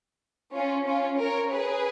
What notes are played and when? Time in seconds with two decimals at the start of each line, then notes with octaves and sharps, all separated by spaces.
0.54 C#4 F4
0.87 C#4 F4
1.20 A#4 C#5
1.53 G#4 B4